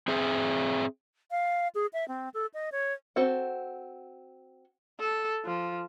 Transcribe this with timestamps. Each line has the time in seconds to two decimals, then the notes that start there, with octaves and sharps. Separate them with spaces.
0.08 C4 G#4 E5
1.31 F5
1.75 G#4
1.93 E5
2.08 C4
2.34 A4
2.54 D#5
2.72 C#5
3.16 C4 F#4 A4 F#5
4.99 A4
5.45 F3